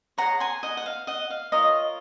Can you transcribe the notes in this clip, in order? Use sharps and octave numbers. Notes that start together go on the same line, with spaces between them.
G#4 C#5 F#5 A#5
G#5 C6
D#5 F#5
F#5
F5
D#5 F#5
F5
F4 A#4 C#5 D#5